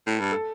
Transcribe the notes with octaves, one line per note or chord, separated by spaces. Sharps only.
A2
G2
A4